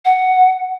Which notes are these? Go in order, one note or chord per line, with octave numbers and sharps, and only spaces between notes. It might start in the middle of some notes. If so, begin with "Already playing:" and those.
F#5